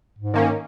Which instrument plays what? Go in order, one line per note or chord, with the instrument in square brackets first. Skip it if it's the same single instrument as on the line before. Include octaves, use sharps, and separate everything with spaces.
[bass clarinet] G#2
[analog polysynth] D#3 A#3 C#4